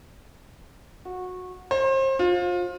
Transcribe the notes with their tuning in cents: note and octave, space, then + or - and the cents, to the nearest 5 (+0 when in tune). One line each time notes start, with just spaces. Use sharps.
F#4 -20
C5 +35
F4 +25